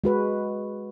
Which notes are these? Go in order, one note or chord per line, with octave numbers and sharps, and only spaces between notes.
G#3 F#4 B4